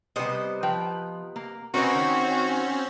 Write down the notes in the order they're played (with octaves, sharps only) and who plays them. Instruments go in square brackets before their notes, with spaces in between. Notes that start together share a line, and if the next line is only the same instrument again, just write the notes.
[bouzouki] C3 B3 D#5 [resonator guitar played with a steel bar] G3 C5
[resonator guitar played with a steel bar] F3 B4 G5
A#3
[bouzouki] A#3 D#4 [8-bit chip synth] C4 C#4 [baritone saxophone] F#4 [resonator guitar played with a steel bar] A#4 B4
[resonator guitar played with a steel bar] D#3